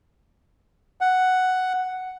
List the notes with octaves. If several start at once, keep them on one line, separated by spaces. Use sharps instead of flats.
F#5